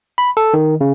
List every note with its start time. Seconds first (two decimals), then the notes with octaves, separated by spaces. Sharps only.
0.18 B5
0.37 A4
0.54 D#3
0.81 C#3